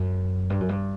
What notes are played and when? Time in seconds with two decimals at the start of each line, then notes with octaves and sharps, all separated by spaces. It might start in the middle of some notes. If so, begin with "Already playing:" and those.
Already playing: F#2
0.50 G2
0.60 F#2
0.69 G2